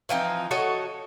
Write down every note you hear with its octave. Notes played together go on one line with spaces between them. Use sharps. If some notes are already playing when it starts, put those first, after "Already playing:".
E3 F3 C4 D#4
F#4 A4 C#5 D#5